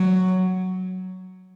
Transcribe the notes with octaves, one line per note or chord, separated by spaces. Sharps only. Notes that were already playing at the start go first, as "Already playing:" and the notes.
Already playing: F#3